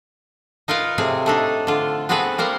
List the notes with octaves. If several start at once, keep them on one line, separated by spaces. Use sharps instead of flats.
D#4 F4 A#4 B4 F5
A2 C3 C4 G#4 G#5
A3 D4 D#4
D3 F4
B3 C4 F#4 G#4 A4 B4
G3 A#3 A#4 C5